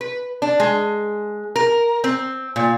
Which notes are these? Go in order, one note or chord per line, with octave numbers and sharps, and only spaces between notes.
B4
D4
G#3
A#4
C4
A#2